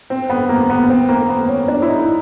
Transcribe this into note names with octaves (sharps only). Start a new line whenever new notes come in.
C4
B3
A#3
B3
C4
A#3
B3
C#4
D4
E4
D#4